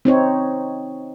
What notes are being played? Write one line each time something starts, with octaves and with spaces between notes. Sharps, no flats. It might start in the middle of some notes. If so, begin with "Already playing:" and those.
C4 D#4 C#5